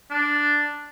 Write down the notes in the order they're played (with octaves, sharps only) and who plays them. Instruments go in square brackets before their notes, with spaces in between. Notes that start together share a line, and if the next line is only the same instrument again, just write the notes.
[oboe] D4